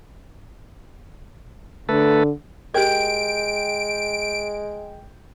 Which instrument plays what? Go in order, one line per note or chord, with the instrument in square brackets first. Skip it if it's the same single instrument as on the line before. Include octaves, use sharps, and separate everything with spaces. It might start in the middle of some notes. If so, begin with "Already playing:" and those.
[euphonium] D3 [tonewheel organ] A3 A4 B4
[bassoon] G#3 [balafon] G4 A#4 [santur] G5 [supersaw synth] D7